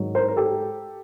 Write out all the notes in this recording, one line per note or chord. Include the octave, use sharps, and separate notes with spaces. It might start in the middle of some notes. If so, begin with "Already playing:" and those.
Already playing: G#2 D#3 F#3
A#4 C5
A#4
G4 A4